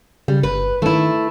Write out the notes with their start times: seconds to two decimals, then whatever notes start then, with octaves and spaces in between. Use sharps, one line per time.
0.28 C#3 G3
0.43 G1 B4
0.82 D#3 A3 E4